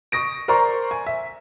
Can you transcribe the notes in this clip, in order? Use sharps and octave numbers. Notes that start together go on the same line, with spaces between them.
C#6 D#6 A#6 D7
A#4 C5 D5 A#5 C6 C#6
G#5
E5